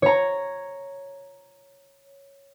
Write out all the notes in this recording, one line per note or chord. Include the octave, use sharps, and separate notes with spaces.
C#5 A#5